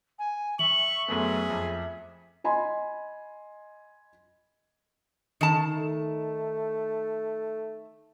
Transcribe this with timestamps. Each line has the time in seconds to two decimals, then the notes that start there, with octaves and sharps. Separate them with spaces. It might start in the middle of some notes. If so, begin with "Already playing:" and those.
0.19 G#5
0.59 E5 C#6 F#7
1.08 F#2 A3 B3 G#4
1.50 F2
2.44 D#5 G#5 B5 C6
5.41 D#3 A5
5.76 A3